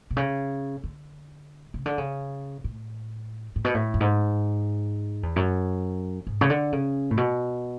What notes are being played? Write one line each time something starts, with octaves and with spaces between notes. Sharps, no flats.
B2
C#3
D3
C#3
D3
C#3
A2
A2
B2
A2
F#2
G#2
E2
F#2
G#2
C#3
D3
C#3
A2
B2